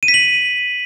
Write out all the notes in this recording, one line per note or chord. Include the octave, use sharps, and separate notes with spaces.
D#7
B6
F#7